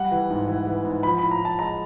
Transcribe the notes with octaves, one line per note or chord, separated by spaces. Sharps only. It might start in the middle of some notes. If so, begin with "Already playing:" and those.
Already playing: G3 F#5
E3
G#2
E3
E3
G#2
F3 B5
A2 B5
A#5
A2 A5
G#3 A#5